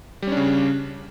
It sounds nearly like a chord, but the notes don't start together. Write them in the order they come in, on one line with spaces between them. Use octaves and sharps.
G3 C#4 D4 C#3